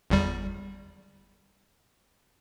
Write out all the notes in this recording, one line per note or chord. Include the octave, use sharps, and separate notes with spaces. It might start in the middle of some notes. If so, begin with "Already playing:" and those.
G1 E2 G3